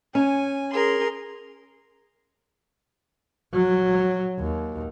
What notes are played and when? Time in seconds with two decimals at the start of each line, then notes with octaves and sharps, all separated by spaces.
0.15 C#4 G#5
0.73 G#4 A#4 C6
3.53 F#3
4.39 D#2